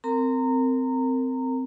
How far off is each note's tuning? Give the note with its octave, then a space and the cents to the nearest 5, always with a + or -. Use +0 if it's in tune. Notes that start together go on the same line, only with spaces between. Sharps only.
C4 -15 A#4 -25 A#5 -20